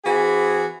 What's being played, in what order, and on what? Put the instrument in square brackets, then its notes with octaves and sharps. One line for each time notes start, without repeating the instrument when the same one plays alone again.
[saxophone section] E3 C4 F#4 G#4